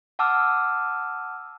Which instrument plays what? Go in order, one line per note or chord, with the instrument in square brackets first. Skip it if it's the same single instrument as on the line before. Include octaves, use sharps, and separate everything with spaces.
[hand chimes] F#5 A5 D6 E6 F6